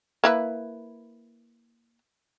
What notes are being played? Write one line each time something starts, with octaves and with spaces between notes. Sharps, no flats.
A#3 E4 B4